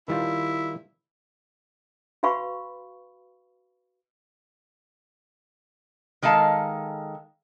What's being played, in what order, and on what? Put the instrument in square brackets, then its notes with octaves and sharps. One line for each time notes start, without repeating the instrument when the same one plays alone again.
[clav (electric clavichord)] D#3 G3 F4 [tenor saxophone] E4
[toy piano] F#4 B4 F5 B5 C#6
[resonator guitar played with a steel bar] D#3 G#3 A4 F5 A5